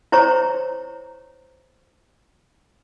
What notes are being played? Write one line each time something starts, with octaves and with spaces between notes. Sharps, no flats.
E4 C5 C#5 A#5 C#6